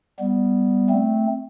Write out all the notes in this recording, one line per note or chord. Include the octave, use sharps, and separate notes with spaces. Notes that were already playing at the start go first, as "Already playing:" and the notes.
G3 B3
A3 C4